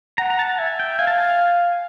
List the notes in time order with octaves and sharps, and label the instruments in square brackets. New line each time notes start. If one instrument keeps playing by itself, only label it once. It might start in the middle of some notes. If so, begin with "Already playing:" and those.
[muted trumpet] F#5 [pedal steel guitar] A#5
[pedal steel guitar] A#5
A5
[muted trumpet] E5 [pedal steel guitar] G#5
[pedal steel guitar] G5
[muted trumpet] F5 [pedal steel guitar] G#5
[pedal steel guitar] A5
G#5